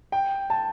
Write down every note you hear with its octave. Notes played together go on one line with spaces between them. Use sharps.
G5
A5